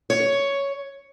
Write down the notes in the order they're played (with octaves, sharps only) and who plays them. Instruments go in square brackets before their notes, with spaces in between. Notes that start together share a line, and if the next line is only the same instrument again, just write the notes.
[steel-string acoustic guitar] C#5